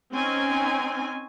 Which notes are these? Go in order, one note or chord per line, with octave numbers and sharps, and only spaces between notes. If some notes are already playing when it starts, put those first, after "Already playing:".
C4 C#4 D#4 G#5